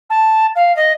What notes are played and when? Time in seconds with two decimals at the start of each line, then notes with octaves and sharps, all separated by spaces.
0.09 A5
0.55 F5
0.76 D#5